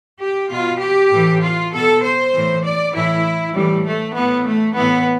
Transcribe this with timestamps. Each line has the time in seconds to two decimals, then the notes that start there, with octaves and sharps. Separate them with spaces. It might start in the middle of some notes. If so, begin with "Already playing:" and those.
0.20 G4
0.50 B2 F4
0.81 G4
1.11 A2 E3
1.42 F4
1.72 B2 A4
2.03 C5
2.33 A2 E3
2.64 D5
2.94 A2 E3 E4
3.55 A2 E3 G3
3.85 A3
4.16 A2 E3 B3
4.46 A3
4.76 A2 E3 B3